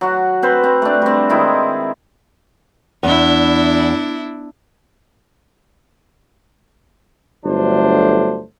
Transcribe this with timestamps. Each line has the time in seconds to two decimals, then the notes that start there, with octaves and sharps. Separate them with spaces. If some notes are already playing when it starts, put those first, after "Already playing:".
0.01 F#3 F#4
0.42 C4 B4 C5
0.63 C4 A#5
0.82 A3 D4
1.02 G3 C4
1.29 D#3 G#3 E4
3.03 E2 D4 E4
7.45 G1 F#3 A3 D4 C5